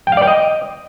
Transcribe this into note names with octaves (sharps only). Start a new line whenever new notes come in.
G5
F5
D5
G5
D#5